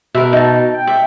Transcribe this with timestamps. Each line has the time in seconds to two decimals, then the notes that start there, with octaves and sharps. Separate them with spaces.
0.15 B2 A#4 B4 E5
0.33 D#4 A5
0.74 G5
0.87 E5